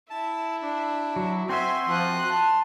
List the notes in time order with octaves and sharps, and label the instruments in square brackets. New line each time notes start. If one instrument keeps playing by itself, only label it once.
[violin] E4 [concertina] A5
[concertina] D4
[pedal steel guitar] F#3
[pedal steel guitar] C4 F#4 E5 [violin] C5 G#5 [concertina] C6
[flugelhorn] F3 [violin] D#6 F#6
[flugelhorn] A5